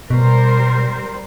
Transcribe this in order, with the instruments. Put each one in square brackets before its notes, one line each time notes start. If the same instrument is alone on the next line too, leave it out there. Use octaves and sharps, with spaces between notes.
[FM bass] B2 [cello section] G3 A#4 C5